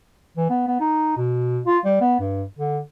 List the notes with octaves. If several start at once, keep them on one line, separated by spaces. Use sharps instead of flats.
E3
B3
B3
D#4
B2
F4
G3
B3
G2
D3